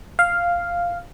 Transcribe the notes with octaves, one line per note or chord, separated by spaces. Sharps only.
F5